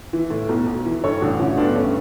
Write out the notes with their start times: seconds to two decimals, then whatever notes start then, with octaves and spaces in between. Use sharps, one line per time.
0.13 E3
0.30 A2
0.49 B1
0.67 B1
0.85 E3
1.04 G2 A4 C#5
1.22 A1 D4 F#4
1.39 D3 C#4 E4
1.58 G2 B3 D4
1.75 A3 C#4